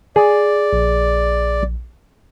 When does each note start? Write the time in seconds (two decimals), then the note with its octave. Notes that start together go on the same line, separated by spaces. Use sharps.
0.16 G#4 D5
0.73 A#1